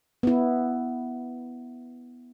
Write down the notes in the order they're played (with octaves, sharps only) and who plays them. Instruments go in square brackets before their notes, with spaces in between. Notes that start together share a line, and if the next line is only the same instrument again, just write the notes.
[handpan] B3 E4